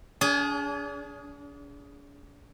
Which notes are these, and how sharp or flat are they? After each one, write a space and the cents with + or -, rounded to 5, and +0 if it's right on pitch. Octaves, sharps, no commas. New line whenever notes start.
D4 -45 G#4 +0